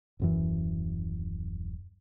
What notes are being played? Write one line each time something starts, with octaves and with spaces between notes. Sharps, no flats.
D#1 F#2 E3